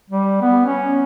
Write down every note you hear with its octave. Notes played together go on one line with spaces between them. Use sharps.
G3
B3
C#4